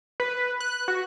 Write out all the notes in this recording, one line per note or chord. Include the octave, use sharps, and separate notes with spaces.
B4
F#6
F#4